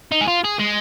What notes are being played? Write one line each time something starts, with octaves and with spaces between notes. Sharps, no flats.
D#4
G#4
F4
G#4
G#3